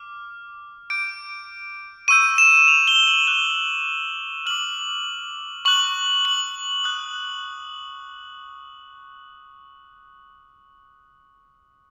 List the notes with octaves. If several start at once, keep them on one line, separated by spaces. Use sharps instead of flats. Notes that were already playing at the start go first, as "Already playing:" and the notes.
Already playing: D6 F6
D6 G6 D7
C#6 E6 G6 D#7
E7
E7
F7
G7
F#7
D6 F#6 G7
D6 F6 F#7
C#6 F#6 F#7
F#7
D#6 F#6